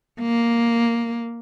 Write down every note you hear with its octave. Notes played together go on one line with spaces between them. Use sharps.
A#3